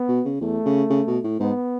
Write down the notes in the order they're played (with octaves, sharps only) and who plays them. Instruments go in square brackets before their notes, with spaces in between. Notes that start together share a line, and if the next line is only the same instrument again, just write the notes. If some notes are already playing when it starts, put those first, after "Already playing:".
Already playing: [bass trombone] B3
[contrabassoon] B2
C#3
[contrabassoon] E2 [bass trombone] A3
[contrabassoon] C#3
C#3
B2
A2
[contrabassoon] G#2 [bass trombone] B3